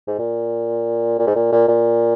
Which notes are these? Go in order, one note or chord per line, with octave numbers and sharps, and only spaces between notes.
G#2
A#2
A#2
G#2
A#2
A#2
A#2